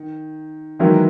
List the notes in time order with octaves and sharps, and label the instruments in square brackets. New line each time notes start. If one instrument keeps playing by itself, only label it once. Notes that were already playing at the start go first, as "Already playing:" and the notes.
Already playing: [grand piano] D#3
[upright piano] D#3 F#3 [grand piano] E3 G#3 B3 E4 A#4